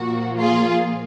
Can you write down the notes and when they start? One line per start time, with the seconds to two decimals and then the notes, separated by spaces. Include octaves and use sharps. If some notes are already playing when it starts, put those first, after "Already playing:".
Already playing: A#2 F3 A#3 F#4
0.38 F4 G#4